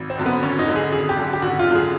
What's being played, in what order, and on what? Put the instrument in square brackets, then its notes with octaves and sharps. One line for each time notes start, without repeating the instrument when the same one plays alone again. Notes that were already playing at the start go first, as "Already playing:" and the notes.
Already playing: [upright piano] G#1
[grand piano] C4
[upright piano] F#2 D3
[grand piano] B3
[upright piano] G#1 [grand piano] C#4
[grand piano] D#4
[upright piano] F#2 D3
[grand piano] G#4
[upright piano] G#1 [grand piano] G#4
[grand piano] G4
[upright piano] F#2 D3
[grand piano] G4
[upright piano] G#1 [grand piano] F#4
[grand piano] F4
[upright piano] F#2 D3
[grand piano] G#4